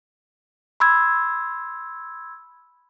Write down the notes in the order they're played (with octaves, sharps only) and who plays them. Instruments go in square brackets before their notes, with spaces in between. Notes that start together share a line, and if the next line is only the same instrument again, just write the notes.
[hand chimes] B5 C6 E6 G#6